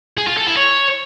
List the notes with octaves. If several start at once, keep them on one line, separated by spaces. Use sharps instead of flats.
G#4
F4
A4
E4
C#5